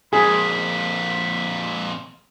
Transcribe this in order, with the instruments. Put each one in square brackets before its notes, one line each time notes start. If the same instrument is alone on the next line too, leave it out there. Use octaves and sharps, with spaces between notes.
[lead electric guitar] F2 A#2 [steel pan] G#4 [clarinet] B5